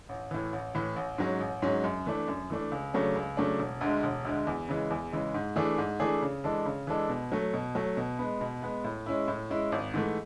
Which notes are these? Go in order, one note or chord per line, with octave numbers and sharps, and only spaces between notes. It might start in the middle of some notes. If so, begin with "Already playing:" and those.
A1
A2 E3
A1
A2 E3
A1
G#2 F#3 C#4
A1
G#2 F#3 C#4
F#2
E3 A3 D4
F#2
E3 A3 D4
C#2
C#3 F#3 A3 D4
C#2
C#3 F#3 A3 D4
E1
D2 D3 G#3
E1
D2 D3 G#3
E2
C#3 E3 G#3
E2
C#3 E3 G#3
G#2
E3 A3 D4 G#4
G#2
E3 A3 D4 G#4
C#3
E3 G#3 D4 A4
C#3
E3 G#3 D4 A4
B2
F#3 A3
B2
F#3 A3
B2
G#3 B3
B2
G#3 B3
A2
G#3 C#4 E4
A2
G#3 C#4 E4
G#1
G#2 E3 A3